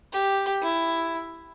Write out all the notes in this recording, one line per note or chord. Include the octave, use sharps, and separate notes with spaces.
G4
E4